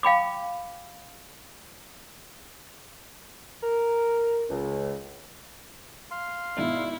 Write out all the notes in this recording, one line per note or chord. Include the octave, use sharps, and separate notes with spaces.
F5 G5 B5 D6
A#4
C#2
F5 C6
G#1 B2 D4 E4